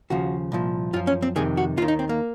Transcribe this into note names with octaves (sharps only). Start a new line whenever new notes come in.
D#2 C#3 F3 F#4
C2 A#2 F3
F#2 F3 F4
C#4
C4
F2 C3 D#3 G#4
F#4
D#2 D#3 F4
D#4
C4
A#3